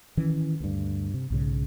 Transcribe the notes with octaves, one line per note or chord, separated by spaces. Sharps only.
D#3 E3 C#4
D2 G2
C3
B1 G#2 C#3